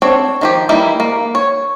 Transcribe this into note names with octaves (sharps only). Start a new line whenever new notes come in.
C4 D4 C#5
D#3 F3 G4
E3 G3 A#3 D#4 E4
A#3
C#5